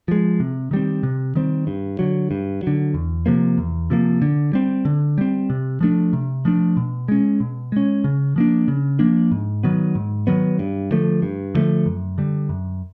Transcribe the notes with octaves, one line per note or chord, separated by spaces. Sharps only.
F3 G#3
C3
D#3 G3 C4
C3
D#3 G3 C4
G2
D3 F#3
G2
D3 F#3
E2
C3 F3 A#3
E2
C3 F3 A#3
D3
G3 C4
D3
G3 C4
C3
F3 A3 D4
C3
F3 A3 D4
B2
G#3 C#4
B2
G#3 C#4
C#3
F3 A#3 D4
C#3
F3 A#3 D4
G#2
D#3 F#3 B3
G#2
D#3 F#3 B3
G2
D3 F3 A3
G2
D3 F3 A3
F#2
D3 G3
F#2